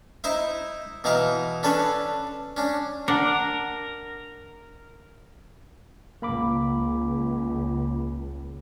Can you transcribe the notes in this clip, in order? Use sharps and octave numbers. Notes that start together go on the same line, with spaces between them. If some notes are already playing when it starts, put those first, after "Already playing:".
D#4 E4 C5 E5
B2 E3 D#4 E4 F5
C#4 D4 A4 B4 C#5
C#4 D4
D4 A#4 F#5 C#7
C#2 A#3 B5 D6